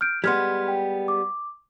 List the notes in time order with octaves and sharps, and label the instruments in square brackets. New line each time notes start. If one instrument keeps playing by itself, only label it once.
[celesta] F6 G6 D7
[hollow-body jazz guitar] G3 G#3 B3 [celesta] C6 F6 G#6
[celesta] G5
D6